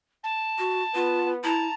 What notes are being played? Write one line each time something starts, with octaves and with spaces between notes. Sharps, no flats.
A5
F#4
B3 F4
E4 A5 A#5